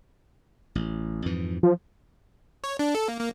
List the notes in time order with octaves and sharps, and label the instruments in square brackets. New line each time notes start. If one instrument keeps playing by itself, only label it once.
[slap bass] A1
F2 G#2 E3
[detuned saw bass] F3
[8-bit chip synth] C#5
D4
A4
A#3
A#3